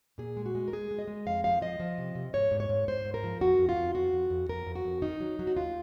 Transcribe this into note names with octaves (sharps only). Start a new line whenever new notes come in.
A#2 G#4
G#3
F#4
G#3
A#4
G#3 G#4
G#3
D#5
G#3
F2 F5
F3 F5
F3 D#5
F3
C3
C3
G#2 C#5
G#2
C#5
G#2
G#2 C5
G#2
A#4
F3
F2 F#4
F2
F4
F2
F2 F#4
F2
F2
F2 A#4
F2
F#4
F2
D#3 D#4
F#3
F#3
F#4
D#2 F4